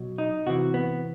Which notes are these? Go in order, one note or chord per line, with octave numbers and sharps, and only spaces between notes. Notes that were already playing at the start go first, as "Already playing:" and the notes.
Already playing: B2 F#3
D#4
C3 E3 F#4
B3